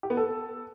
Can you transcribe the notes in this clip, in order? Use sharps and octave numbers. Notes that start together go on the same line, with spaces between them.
G4
B3
A4